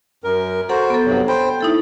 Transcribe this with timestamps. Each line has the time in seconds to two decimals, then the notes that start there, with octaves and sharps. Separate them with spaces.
0.24 F#2 A#4
0.69 F#4 A4 C5 F#5 A#5
0.90 B3 A4
1.06 G2 C3 F#3
1.28 C5 G5 B5
1.61 A3 D#4 E4 A4